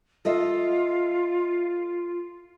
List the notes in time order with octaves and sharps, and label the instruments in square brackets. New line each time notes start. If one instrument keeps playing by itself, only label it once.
[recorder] F4 [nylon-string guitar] A4 D#5 E5